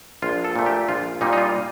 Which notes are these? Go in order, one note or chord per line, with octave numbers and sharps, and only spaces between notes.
A#1 F4
A4
A#2 A3
G4
A#1 F4
A#2 G3 A#3 D#4
D#4
F4